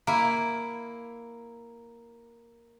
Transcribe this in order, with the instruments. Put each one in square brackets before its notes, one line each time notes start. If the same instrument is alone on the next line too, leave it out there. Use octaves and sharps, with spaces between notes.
[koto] A#3 E4